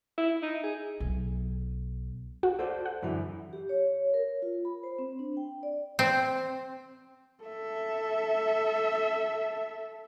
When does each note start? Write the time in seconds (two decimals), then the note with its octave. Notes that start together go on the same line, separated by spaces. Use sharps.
0.18 E4
0.43 D#4
0.63 G#4
1.00 B1
2.43 F#4
2.59 A4 C5 D5
2.86 F#5
3.02 F#2 D3 E3
3.53 G4
3.69 C#5
4.14 A#4
4.42 F4
4.65 B5
4.83 C5
4.99 C4
5.19 D4
5.37 G5
5.63 D5
5.99 C4
7.45 A4 E5